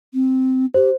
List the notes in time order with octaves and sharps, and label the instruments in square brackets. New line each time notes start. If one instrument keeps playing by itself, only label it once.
[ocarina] C4
[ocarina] G4 [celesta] C5